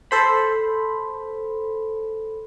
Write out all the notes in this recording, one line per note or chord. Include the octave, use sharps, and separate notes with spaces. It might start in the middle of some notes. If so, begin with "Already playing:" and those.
A4 C5 B5